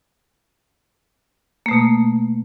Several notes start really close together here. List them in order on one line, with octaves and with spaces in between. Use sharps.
A#3 A3 B2